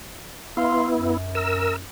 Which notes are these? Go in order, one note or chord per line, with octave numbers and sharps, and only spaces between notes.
B3 E4 F5 C6
F#2
A#4 E6